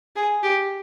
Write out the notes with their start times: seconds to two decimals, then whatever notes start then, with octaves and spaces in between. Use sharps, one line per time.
0.16 G#4
0.43 G4